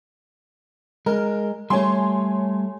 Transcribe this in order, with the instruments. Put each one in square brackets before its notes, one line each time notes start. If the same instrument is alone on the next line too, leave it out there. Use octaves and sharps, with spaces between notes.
[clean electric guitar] G#3 [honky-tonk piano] A#4
[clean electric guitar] G3 A3 [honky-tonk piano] C#5 G#5 C6